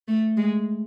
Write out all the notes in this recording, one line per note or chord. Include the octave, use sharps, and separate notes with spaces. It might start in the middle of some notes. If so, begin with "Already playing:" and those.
A3
G#3